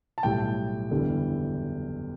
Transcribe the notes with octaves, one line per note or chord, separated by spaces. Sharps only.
A5
B1 A2 G3 G5
F#1 E2 D3 G3